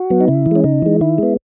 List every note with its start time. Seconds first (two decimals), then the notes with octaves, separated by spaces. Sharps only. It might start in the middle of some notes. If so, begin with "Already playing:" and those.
Already playing: F#4
0.10 F#3 B3
0.21 D#4
0.28 C#3 E4
0.46 E3
0.51 G#3 C#4
0.64 C#3 D#4
0.82 E3 G#3
1.01 D#3 E4
1.18 G#3 B3